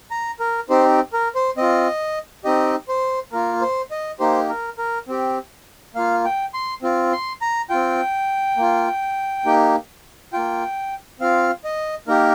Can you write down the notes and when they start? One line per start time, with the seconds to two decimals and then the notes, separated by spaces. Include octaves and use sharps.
0.11 A#5
0.40 A#4
0.70 C4 D#4 G4 C5
1.13 A#4
1.35 C5
1.57 C4 F4 D#5
2.44 C4 D#4 G4 D#5
2.89 C5
3.33 A#3 F4 A#4
3.61 C5
3.91 D#5
4.20 A#3 D#4 G4 C5
4.49 A#4
4.78 A#4
5.08 C4 G4
5.95 A#3 F4 F5
6.25 G5
6.54 C6
6.82 C4 F4
7.12 C6
7.41 A#5
7.70 C4 F4 G5
8.57 A#3 F4
9.45 A#3 D#4 G4
10.33 A#3 F4 G5
11.20 C4 F4 F5
11.64 D#5
12.07 A#3 D#4 G4 A#4